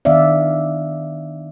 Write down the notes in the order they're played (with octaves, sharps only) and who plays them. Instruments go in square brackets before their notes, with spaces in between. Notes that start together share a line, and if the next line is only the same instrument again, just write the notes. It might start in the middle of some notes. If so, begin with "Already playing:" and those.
[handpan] D#3 B3 D4 D5 E5 F5